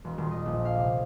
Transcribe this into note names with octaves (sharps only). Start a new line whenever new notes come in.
E1
D#1
D#5
A#1
F5
C3